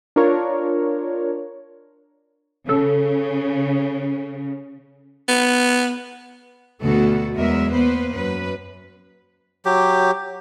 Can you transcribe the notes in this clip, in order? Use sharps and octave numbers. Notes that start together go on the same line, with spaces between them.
D4 F4 A#4 C#5
C#3 A4
B3
D2 B2 F#4 A4
E2 F#3 G#3 A#4 E5
A#3 B3 B4 C5
F#2 B4
F#3 G4